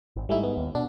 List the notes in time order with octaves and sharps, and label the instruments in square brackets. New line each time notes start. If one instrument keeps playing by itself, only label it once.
[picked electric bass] G#1
[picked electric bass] G#2 [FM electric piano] G3 A3 E4
[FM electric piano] B3
[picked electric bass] D#2
[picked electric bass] B2 [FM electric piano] D4